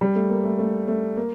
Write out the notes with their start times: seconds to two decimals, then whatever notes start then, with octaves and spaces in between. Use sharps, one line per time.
0.01 G3
0.16 A3
0.30 A#3
0.44 A3
0.59 A3
0.88 A3
1.17 A#3